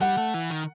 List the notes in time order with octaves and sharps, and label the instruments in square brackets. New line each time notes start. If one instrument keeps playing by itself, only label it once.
[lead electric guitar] G3 [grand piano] F#5
[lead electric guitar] A3
E3
D#3